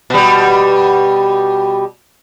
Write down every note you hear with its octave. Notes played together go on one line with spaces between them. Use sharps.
B2 G3